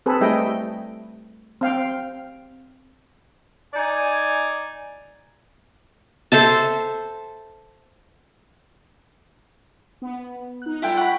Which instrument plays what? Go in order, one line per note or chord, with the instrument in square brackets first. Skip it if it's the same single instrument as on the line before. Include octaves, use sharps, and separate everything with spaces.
[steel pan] C4 G#4 A4 B4
G3 A3 E4 D#5 G5
C4 F5 G5
[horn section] D#4 D5 G#5
[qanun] A4 C5 E5 A5
[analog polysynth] B3
D#4 F#6
[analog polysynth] G3 F4 [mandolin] E4 A4 G5
[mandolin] F#5 B5 [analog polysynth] C#6